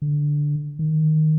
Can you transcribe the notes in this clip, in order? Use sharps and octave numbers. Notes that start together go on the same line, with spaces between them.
D3
D#3